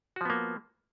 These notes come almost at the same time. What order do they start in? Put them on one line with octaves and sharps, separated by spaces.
F#4 F3 B3 A#3